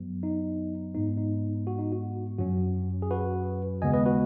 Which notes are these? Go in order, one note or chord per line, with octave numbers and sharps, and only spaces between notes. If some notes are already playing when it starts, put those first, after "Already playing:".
Already playing: F#2 F#3 B3
D#4
G#2 G#3 B3 D#4
D#4
F#4
D#4
F#4
F#2 F#3 C#4 F#4
G#4
F#4 B4
D#2 C#3 G#3 B3 D#5 G#5
B4 D#5
F#4 B4